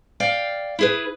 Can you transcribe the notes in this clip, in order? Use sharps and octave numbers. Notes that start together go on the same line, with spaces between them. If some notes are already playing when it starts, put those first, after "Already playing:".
D5 F5 G5
E4 G#4 B4